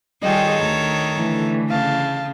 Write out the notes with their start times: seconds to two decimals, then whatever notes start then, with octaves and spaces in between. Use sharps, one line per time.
0.23 D#3 G3 F4 G#4 A4 C#5 D#5 G5
0.62 D2 A#5
1.16 D3 E3 A3
1.70 C#3 F5 A5